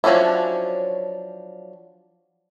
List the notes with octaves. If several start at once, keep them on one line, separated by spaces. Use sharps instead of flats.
F3 F#3 C#4 D4 E4